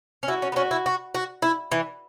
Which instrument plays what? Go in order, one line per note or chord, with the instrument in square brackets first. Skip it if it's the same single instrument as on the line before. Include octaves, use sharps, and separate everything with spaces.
[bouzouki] C#4
[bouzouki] E4 [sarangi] F#4
[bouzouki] C#4
B3
[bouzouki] C#4 [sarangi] F#4
[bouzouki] E4
F#4
F#4
E4
E3